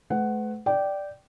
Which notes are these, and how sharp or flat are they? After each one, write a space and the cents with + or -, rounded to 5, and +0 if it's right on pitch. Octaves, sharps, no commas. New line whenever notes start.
A3 -35 B4 +35 F#5 +10
D5 +0 G5 -15